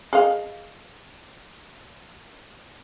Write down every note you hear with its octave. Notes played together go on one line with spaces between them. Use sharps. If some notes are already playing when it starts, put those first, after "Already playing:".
G#4 D#5 F5